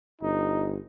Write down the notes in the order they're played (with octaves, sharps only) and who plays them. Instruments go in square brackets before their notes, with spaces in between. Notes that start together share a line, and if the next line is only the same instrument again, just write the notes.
[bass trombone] G1 [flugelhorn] D#4